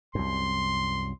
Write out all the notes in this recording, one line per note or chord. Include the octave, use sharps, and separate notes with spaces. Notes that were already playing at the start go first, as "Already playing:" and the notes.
C2 F#2 C6